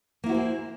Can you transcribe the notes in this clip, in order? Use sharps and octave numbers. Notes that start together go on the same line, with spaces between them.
A#3 E4 F#4 G#4 C5